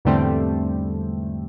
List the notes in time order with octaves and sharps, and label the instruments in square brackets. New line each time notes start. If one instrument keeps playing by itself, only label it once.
[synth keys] E2 G#2 D3 G3 A3 C4